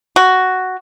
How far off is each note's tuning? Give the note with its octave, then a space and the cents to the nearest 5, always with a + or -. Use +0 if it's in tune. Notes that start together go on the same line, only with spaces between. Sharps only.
F#4 +5